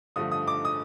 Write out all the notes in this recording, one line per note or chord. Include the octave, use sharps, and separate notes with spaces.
G2 D3 F3 A3 D#6
D#6
D6
D#6